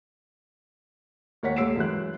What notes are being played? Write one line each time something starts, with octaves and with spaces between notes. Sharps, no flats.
D#2 A#4 C#5 F#5 B6
D#1 A#3 E6 C7 D7 E7
F#2 E3 G#3 F#6